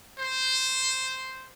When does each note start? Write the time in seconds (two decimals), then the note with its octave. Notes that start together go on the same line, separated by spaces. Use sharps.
0.18 C5